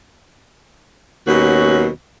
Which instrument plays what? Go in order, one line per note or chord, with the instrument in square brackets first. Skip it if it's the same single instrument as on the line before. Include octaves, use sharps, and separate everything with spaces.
[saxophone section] D#2 B2 F#3 C#4 F#4